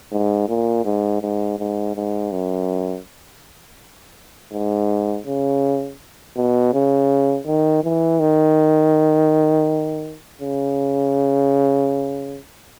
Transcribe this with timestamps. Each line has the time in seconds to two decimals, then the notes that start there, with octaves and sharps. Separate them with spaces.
0.12 G#2
0.49 A#2
0.85 G#2
1.22 G#2
1.59 G#2
1.95 G#2
2.32 F#2
4.53 G#2
5.27 C#3
6.36 B2
6.73 C#3
7.46 D#3
7.84 E3
8.20 D#3
10.41 C#3